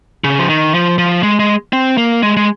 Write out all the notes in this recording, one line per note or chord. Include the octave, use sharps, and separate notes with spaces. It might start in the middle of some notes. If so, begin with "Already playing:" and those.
C#3
F3
D#3
F3
F3
G#3
G#3
C4
A#3
G#3
G#3